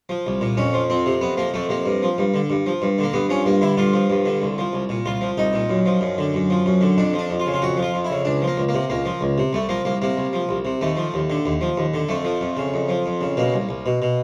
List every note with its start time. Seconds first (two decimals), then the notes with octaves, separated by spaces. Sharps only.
0.09 F3
0.27 C2
0.41 A#2
0.57 F2 C#4
0.73 F3
0.90 F2 C4
1.06 C3
1.21 F2 B3
1.37 F3 A#3
1.54 F2 A3
1.69 C3 A#3
1.86 G2
2.02 F3
2.18 G2
2.34 D3
2.50 G2
2.66 F3
2.82 G2
2.98 D3
3.03 A#3
3.13 G2 B3
3.29 F3 C#4
3.45 G2 A#3
3.61 D3 E4
3.77 G2 F4
3.93 F3
4.10 G2
4.26 D3
4.42 C2
4.58 F3
4.73 C2
4.89 A#2
5.06 C2 F4
5.21 F3
5.38 C2 D#4
5.53 A#2
5.69 F#2
5.86 F3
6.01 F#2
6.18 D3
6.34 F#2
6.50 F3
6.66 F#2
6.81 D3
6.98 F2 D4
7.14 F3
7.19 D4
7.30 F2
7.40 F4
7.46 C#3
7.54 F4
7.62 F2 F#4
7.77 F3
7.83 F4
7.94 F2
8.05 E4
8.10 C#3
8.25 C#2 D4
8.42 F3
8.47 A#3
8.57 C#2
8.69 A#3
8.74 C3
8.90 C#2 A#3
9.05 F3
9.21 C#2
9.38 C3
9.53 C2 A3
9.69 F3 A#3
9.85 C2 A#3
10.02 C3 A#3
10.17 C2
10.33 F3
10.49 C2
10.65 C3
10.81 D#2 A3
10.97 F3
11.14 D#2
11.30 D3
11.46 D#2
11.61 F3
11.78 D#2
11.94 D3
12.09 F2 A3
12.25 F3
12.41 F2
12.57 C#3
12.74 F2
12.89 F3
13.06 F2
13.21 C#3
13.37 B2 A#3
13.54 C2
13.69 C2
13.86 B2
14.02 B2